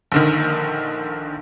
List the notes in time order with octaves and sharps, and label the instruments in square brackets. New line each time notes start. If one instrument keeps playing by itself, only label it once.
[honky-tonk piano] A#1 D3 D#3